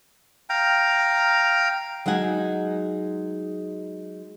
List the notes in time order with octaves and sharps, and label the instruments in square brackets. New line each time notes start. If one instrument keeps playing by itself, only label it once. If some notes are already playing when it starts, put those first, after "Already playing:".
[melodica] F5 G5 A#5
[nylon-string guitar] F#3 G#3 D#4 F#5 G#5